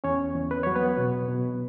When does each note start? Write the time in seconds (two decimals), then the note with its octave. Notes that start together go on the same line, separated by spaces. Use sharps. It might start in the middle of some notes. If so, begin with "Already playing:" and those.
0.04 E2 C#4 C#5
0.35 E2
0.51 B4
0.63 F#3 C#5
0.76 B3 B4
0.98 B2
1.29 B2